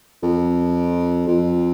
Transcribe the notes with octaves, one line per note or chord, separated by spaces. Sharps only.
F2
F2